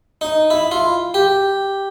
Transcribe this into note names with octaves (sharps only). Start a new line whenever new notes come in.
D#4
E4
F4
G4